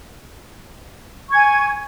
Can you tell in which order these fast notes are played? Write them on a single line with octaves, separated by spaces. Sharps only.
C#6 G#6 G#5